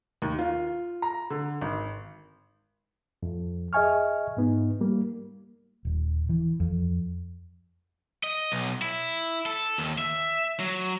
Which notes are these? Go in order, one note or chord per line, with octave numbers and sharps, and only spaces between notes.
D#2
F4
A#5
D3
G#1
F2
G#4 D#5 E5 G#5 C#6 F6
G#2 B3 D#4
G3 A#3
D#1
E3
F2
D#5
B1
E4
A4
D#2
E5
F#3